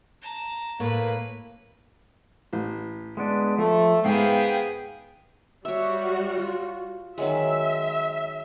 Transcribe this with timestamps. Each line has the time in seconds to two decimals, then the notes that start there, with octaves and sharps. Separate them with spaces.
0.22 A5 A#5
0.80 A2 A#3 B4
2.53 A1
3.17 G#3 B3 D4
3.58 F3 A3
4.05 G#2 B3 G#4 F5 G5
5.65 G3 F#4 C#5 E5
6.38 F4
7.18 D#3 F#3 G#3 E5